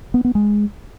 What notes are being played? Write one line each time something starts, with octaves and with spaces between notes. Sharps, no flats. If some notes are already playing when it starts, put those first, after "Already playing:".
B3
B3
G#3